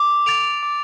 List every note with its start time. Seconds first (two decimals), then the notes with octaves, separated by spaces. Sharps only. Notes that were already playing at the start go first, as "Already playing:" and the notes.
Already playing: D6
0.26 A6 D7 F7
0.63 D6